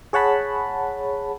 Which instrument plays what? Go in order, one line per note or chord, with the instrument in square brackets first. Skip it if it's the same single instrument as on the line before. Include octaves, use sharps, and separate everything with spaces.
[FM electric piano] G#4 C#5 F#5 A5 B5